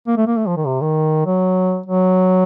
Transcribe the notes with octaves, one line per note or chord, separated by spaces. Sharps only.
A#3
A3
A#3
A3
F3
D#3
C3
D#3
F#3
F#3